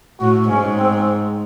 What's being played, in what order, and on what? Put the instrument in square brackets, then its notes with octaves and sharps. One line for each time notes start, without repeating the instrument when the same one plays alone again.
[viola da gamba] A2 [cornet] F#4
[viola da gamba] G#2 [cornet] C#4
[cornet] C4